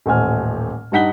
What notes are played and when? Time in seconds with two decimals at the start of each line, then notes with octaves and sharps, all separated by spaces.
0.06 D#1 A1 A3 C5 G#5 F6
0.92 G2 G3 D#4 F#5 B6 G7